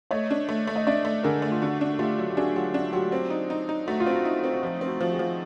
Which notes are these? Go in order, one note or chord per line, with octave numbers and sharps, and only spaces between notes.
A3 C#5 D#5
D4
A3
A3
D#5
D4 D5 E5
A3
D3 G#4 A#4
A3
F4
D3 F#4
D4
A3 F4 G4
F#3
G4
D4 F#4 G#4
F#3 F4 G4
D4 F#4
F#3 F4 G4
C4
D#4
D#4
D#4
A3 F#4
F4
C4
F#4
D#4
C4
F#4
F3 F4
C4
F#4
F3
F#4 G#4
F3